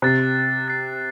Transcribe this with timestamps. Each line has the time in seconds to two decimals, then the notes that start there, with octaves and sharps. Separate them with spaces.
0.02 C3 F#6 A6 C7
0.68 F#6 A6 C7